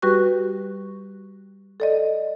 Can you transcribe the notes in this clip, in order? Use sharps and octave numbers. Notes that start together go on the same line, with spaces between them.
G3 F#4 G4 B4 C#6 F#6
A4 D5 D#5